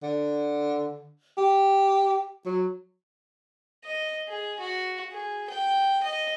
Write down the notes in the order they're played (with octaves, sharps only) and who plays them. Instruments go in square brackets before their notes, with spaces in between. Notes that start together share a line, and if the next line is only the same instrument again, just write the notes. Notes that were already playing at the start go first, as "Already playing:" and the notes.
[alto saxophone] D3
G4
F#3
[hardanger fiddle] D#5
G#4
F#4
G#4
G5
D#5